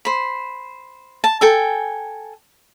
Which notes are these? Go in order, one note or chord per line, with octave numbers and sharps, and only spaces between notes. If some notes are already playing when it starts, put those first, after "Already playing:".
C5 B5
A5
A4 G5 G#5